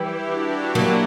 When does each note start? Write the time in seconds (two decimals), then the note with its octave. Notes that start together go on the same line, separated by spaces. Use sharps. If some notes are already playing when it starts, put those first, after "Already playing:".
Already playing: E3 G3 E4 G4
0.23 D4 F#4
0.75 F#3 A#3